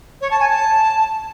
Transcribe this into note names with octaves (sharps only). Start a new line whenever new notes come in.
C#5
A5
G#5
A5